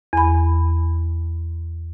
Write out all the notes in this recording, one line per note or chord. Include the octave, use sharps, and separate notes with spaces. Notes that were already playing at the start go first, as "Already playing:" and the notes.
E2 B5